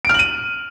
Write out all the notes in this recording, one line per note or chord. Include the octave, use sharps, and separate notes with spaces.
F6 D7 D#7 F#7